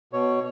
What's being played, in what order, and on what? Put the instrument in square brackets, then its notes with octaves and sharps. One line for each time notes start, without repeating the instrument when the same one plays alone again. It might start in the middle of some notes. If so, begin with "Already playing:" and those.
[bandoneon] B2 C#5